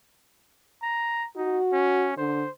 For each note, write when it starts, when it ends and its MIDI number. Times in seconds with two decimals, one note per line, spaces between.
0.82 1.27 82
1.36 1.59 63
1.36 2.10 66
1.73 2.14 61
2.17 2.43 50
2.17 2.51 72